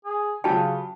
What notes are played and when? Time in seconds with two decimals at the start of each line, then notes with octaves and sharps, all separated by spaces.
0.05 G#4
0.44 C#3 F#3 F4 G4 G5 A5